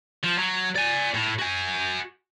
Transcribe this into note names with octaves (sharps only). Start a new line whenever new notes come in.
F3
F#3
D5 G#5
A2
F#4 G#5